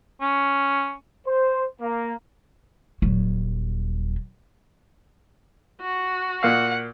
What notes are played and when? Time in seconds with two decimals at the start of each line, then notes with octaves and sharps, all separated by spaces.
0.21 C#4
1.28 C5
1.82 A#3
3.02 D#1 F#3
5.81 F#4
6.43 A#2 F5 F#5